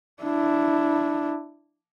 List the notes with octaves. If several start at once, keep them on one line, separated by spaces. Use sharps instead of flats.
D4 E4